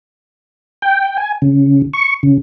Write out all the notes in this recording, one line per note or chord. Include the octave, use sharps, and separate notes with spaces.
G5
G#5
C#3
C#6
C#3